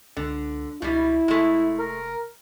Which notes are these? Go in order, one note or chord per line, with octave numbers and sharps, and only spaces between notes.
C#2 D3
C#2 B2 G3 E4
F1 G#3 A3
A#4